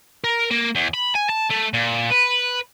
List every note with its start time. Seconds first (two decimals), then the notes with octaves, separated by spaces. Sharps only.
0.24 A#4
0.51 A#3
0.75 E2
0.94 B5
1.15 G#5
1.30 A5
1.51 A3
1.73 A#2
2.10 B4